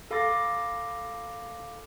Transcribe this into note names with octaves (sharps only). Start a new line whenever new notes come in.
A4 F5 B5 D6 A6 A#6